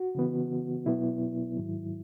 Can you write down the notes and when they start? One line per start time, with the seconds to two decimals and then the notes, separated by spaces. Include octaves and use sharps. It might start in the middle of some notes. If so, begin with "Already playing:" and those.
Already playing: F#4
0.15 C#3 E3 B3
0.86 B2 F#3 B3 E4
1.56 G#2 D#3 F#3